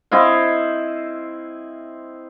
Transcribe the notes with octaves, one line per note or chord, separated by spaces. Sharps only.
C4 E4 D#5 F5